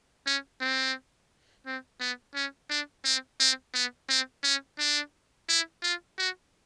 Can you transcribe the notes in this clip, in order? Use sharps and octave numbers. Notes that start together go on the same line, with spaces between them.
C#4
C4
C4
B3
C#4
D4
C4
C4
B3
C4
C#4
D4
E4
F4
F#4